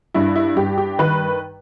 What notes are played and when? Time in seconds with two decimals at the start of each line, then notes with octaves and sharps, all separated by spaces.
0.14 G2 E4
0.36 E4
0.56 G2 G4
0.78 G4
0.99 D#3 B4